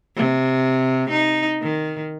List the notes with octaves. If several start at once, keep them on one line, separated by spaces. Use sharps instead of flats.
C3
D#4
D#3